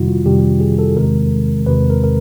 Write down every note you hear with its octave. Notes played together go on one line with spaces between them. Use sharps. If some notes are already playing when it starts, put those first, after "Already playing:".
Already playing: F2 C3 D#3 G3 E4 F#4
F4
F2 C3 D#3 G3 G4
G#4
A4
E2 C3 D#3 G#3 A#4
E2 C3 D#3 G#3 B4
A#4
A#4